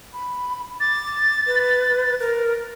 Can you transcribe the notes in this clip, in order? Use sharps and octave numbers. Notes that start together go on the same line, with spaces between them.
B5
D6 A6
B4
A#4